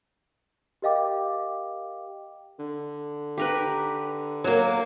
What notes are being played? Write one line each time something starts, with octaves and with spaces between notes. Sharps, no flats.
G4 A#4 D#5 F5 G5 D6
D3
G4 A#4 B4
F#3 A#3